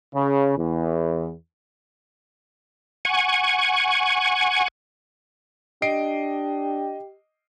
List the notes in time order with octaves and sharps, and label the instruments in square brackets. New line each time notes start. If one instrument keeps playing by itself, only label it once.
[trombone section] C#3
E2
[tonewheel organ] F#5 G#5 C#6
[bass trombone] D4 [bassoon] G4 [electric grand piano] D#5 C7 D7